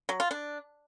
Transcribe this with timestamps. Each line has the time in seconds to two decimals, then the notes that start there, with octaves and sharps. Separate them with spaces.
0.09 F#3
0.20 F4
0.31 D4